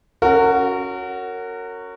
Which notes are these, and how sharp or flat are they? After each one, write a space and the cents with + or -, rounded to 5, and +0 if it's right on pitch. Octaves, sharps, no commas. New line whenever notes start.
C#4 +0 F#4 +0 A#4 -30